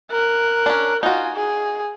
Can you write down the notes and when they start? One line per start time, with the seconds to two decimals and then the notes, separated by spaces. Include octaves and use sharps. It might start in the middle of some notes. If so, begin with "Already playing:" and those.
0.11 A#4 F#6
0.66 C#4 D4
1.03 D#4 F4 F#4 G#5
1.36 G#4